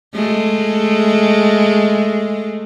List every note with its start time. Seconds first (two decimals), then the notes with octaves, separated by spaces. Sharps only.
0.14 G#3 A3